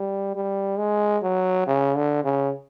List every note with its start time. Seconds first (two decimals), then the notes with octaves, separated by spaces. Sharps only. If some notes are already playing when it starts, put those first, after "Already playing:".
Already playing: G3
0.35 G3
0.78 G#3
1.23 F#3
1.67 C#3
1.96 D3
2.24 C#3